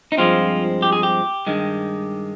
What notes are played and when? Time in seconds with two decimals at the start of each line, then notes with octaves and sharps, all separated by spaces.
0.12 D#4
0.18 G2 F3 G#3 C4 F4
0.82 G4
0.93 G#4
1.03 G4
1.46 G2 D#3 G#3